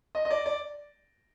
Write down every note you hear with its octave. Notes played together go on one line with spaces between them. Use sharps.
D#5
D#5
D5
D5